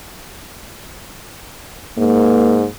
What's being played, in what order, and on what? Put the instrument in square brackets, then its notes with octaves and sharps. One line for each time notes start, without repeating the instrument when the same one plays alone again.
[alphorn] G#2 [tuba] A#3